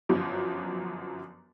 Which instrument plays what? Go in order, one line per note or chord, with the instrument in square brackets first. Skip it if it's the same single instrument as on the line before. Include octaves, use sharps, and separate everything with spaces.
[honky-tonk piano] G1 F#2 F3 F#3